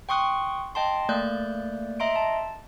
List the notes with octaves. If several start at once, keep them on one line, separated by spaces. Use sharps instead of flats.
G5 C6 C#6 D#6 F#6
D#5 G5 A5 C6
A3 A#3 D5 F#6 G6
D#5 E5 A#5 C6 D7
A5